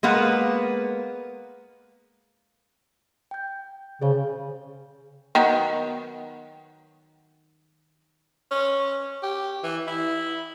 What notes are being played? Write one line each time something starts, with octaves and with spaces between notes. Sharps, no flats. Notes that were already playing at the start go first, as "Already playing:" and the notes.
G#3 A#3 B3 B4
G5 G6
C#3 G#4 C5 C#5
D#3 F#3 B3
C#4
G4
E3
E4